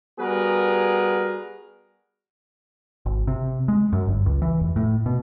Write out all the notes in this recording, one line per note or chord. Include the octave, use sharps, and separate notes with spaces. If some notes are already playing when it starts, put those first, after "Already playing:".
G3 B3 F#4 G#4 A#4 B4
G#1
C3
G#3
F#2
G1
C#2
E3
F1
A2
B2